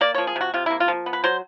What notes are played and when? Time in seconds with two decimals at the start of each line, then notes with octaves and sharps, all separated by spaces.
0.01 A#3 D5
0.14 F3 C#5
0.27 G#4
0.36 C3 F#4
0.54 C3 F4
0.66 E4
0.71 A#3
0.80 F4
0.88 F3
1.06 B3
1.13 B4
1.24 F#3 C5